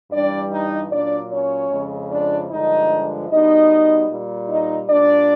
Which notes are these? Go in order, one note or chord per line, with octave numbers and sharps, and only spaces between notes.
G2 E3 G3 D4 D5
D#4 D#5
A#2 F#3 D4 D5
C#4 C#5
F2 C#3 F3 G#3
D4 D5
G2 D3 F3 G#3 D#4 D#5
B2 G3 D#4 D#5
A#2 G3
D#4 D#5
A#2 G3 D4 D5